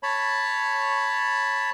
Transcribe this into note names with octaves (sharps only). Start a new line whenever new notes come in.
C#5 A5 B5